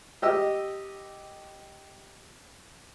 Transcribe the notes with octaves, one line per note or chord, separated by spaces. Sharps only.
G4 D#5 E6